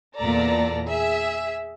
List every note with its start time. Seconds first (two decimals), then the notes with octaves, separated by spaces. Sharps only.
0.17 E2 A#2 A4 D5 A#5
0.87 G#4 E5